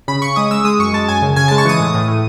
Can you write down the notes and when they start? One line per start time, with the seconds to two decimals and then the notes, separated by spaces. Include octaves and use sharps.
0.08 C#3 B5
0.22 C#3 C#6
0.36 G#3 D#6
0.51 G#3 E6
0.65 G#3 D#6
0.79 F#2 C#6
0.93 G#3 A5
1.08 F#2 G#5
1.22 C#3
1.36 C#3 G#5
1.48 G#3 A5
1.58 C#6
1.65 E3 D#6
1.79 A2
1.94 A2
2.08 A2